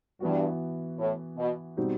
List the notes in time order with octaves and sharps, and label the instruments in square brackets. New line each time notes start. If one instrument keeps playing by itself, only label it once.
[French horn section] G2 [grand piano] E3 B3 F#4
[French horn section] A2
B2
[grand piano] B2 G3 C4 D#4 F#4